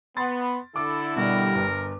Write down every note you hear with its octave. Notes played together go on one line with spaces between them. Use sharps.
B3 B5 C6 A6
D3 E4 A4 D6
B2 G3 A#4
G1